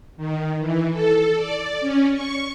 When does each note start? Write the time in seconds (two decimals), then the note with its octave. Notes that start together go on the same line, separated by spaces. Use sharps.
0.17 D#3
0.59 E3
0.92 A4
1.35 D5
1.81 C#4
2.13 C#6